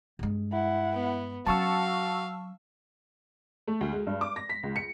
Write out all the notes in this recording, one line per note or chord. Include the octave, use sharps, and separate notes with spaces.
G2 G#3
E4 F#5
B3
F#3 C#4 F#4 F5 A5 C#6 E6
A3
D2
G#3
G2
D6
A#6
B6
C#2
C#7